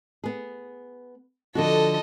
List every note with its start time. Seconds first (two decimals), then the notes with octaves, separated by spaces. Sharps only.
0.24 B3 G#4
1.55 D3 F3 F#4 A4 D#5